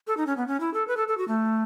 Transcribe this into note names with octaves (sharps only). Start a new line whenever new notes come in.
A4
D#4
C#4
B3
C#4
E4
A4
B4
A4
A4
F#4
A3